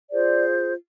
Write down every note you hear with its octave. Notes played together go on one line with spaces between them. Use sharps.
F4 G#4 C5 D5